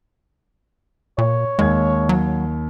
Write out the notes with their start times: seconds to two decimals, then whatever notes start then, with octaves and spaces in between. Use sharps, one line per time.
1.18 A#2 C#5
1.59 D#2 G#3 G#6
2.09 F#3